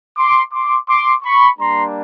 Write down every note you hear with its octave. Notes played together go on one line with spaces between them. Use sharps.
C6 D6
C6 D6
C6 D6
B5 C#6
G3 A#3 D4 A#5 C6